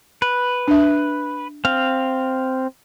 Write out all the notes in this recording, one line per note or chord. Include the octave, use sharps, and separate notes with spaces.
B4
D4 E5
C4 F5